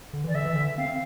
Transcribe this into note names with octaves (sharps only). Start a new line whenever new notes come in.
D3
E3 D5
D3 E5
E3
D3
C4 F5